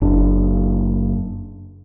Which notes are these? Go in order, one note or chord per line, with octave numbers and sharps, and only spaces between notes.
F#1 D4